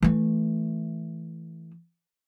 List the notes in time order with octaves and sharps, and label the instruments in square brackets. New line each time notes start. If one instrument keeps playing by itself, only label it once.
[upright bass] E3 A3